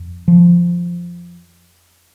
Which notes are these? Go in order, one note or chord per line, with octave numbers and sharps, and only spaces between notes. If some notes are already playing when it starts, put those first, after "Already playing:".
Already playing: F2
F3